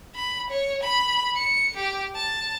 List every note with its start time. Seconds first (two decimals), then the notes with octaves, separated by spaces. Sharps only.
0.15 B5
0.50 C#5
0.83 B5
1.36 C#7
1.77 G4
2.15 A5